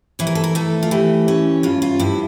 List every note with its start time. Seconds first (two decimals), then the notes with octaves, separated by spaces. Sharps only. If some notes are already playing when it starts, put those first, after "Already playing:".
0.19 E3 C#5
0.27 A#4
0.35 A4
0.44 A#4
0.55 A3 A4
0.83 F4
0.91 E3 G4
1.28 C#4
1.63 G2 F4
1.82 F4
1.99 G2 E4